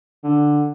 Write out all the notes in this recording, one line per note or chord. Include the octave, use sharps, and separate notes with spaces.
D3